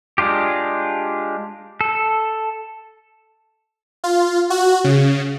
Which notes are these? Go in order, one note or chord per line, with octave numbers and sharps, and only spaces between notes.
G#3 D4 F4 G4
A4
F4
F#4
C#3